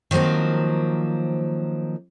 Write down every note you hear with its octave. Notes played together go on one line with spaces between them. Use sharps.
D#3 F3 F#3 A#3 C4